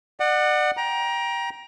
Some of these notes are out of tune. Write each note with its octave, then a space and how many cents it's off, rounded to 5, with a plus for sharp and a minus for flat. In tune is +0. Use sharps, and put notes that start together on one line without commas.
D5 +40 F#5 +0
G5 +0 A#5 +25